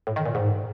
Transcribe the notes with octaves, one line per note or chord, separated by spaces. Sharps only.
A2
D#3
A#2
G#2